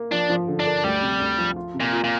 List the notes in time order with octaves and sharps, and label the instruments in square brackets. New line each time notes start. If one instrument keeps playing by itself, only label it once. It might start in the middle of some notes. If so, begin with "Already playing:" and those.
Already playing: [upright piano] A#3
[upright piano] F3 [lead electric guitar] D4
[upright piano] F3
D3
[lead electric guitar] D4
[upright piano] A#4
[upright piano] D2 [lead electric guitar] G3
[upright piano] C3
D2
F3
F4
C3
[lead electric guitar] A#2
[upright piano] F4
[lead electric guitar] A#2